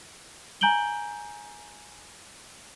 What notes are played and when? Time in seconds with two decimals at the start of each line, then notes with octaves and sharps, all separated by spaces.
0.61 G#5 A#5 G6 D7 F#7 G7